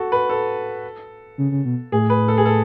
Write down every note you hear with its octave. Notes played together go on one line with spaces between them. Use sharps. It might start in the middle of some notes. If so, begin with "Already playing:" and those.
Already playing: F#4 A4
B4
A4
C#3
C#3
B2
A2 G#4
B4
A4
G#4
A4